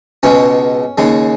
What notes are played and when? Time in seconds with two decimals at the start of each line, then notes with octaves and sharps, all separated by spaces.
0.23 C#2 B2 G#3 C#4
0.98 D#2 C#3 G#3